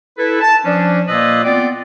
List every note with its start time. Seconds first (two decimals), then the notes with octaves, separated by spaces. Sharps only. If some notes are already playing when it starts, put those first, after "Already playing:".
0.18 E4 A4 B4
0.41 A5
0.65 F3 C#4 D4
1.08 A#2 A#3 F4 B4 D#5 E6
1.44 B3 C4 F4 D5